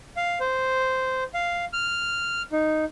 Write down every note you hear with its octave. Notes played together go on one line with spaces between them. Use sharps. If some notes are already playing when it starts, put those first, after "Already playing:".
F5
C5
F5
F6
D#4